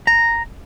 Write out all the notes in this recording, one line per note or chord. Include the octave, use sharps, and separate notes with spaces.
A#5